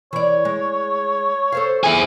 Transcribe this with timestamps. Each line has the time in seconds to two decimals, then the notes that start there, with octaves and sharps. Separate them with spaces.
0.13 E3 C#5 D5
0.45 G#3
1.52 A4 C5 F5
1.83 E4 G#4